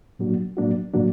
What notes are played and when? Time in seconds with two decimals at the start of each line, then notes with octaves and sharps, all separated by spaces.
0.19 A2 F#3 A#3 D4 F#4
0.57 A2 F#3 A#3 D4 F#4
0.94 A2 F#3 A#3 D4 F#4